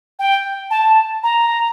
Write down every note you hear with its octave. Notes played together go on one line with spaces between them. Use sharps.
G5
A5
A#5